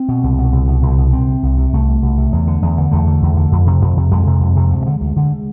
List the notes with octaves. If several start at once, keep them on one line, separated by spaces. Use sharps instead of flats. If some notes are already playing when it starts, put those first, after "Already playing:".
Already playing: C4
B2
C2
B2
C2
B2
C2
B2
C2 C4
C3
C2
C3
C2 A3
C3
C2
C3
E2
D3
E2
D3
E2 A3
D3
E2
D3
F2
C3
F2
C3
F2 G#3
C3
F2
C3
D2
D3
D2
D3